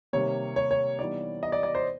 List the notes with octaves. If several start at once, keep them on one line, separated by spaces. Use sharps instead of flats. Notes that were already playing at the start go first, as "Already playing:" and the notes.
C3 D#3 G3 A#3 C#5
C#5
C#5
E3 G3 B3 D#4 D5
D#5
D5
D5
C5